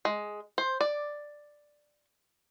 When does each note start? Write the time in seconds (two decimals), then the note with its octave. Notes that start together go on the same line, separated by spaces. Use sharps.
0.05 G#3
0.58 C5
0.81 D5